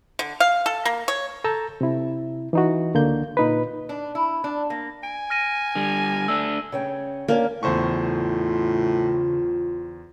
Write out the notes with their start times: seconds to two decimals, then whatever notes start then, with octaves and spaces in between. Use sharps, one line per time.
0.19 D3
0.40 F5
0.66 A4
0.85 A#3
1.08 C#5
1.44 A4 A5 A#5 E6 G6
1.81 C3 E4
2.53 E3 D#4 F#4
2.94 C#2 D3 A#3 G6
3.37 A#2 D#4 B4
3.89 D4
4.15 E4
4.44 D4
4.70 A#3
5.03 G#5 D7
5.30 F6 A#6 D#7
5.76 D3 G3
6.28 A3 D4 E6
6.72 C#3 C#5 G5
7.28 A#3 C#4 D4
7.63 E2 A2 C#3 F4 C5 C#6